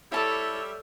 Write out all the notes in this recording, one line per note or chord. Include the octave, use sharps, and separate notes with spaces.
G3 E4 A4 C#5 E5 A5 D6